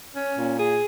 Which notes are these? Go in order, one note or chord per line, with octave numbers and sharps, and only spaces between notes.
C#4
A#2
G#4